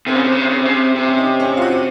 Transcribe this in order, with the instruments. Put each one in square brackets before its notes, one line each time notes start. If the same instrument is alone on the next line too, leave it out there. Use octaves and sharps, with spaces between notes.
[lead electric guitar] C3 [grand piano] C4
[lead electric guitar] C#3
C3
C#3
C3
C#3
C3
C#3
C3
C3
[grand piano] C#4
D#4
C#4
F4
F#4